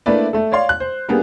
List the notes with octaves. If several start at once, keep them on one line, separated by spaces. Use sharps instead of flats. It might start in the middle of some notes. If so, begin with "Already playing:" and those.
A3 A#3 D4 E4 B4 D5
A3 A4
C#5 D5 F5 C6
F#6
C5
G3 A#3 B3 D4 G4 G#4